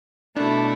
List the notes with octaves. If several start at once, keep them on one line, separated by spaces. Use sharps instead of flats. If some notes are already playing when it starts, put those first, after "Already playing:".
B2 A3 D4 E4